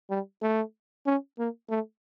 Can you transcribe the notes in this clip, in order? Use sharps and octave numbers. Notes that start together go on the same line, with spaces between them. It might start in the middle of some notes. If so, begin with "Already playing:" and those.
G3
A3
C#4
A#3
A3